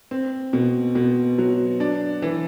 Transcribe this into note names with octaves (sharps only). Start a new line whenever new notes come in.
C4
B2
B2
F#3
D4
E3